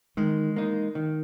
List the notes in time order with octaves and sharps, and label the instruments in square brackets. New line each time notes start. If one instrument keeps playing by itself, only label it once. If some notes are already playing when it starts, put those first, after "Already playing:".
[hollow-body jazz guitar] D#3 [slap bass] E3 G#3
[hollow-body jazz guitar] A#3 D#4
D#3